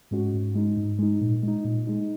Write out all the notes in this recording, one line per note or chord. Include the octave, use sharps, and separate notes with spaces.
G#2 G#3 C#4 F#4
G#2
G#3 D#4
G#2
G#3 D#4
A#2
G#3 D#4
A#2
G#3 D#4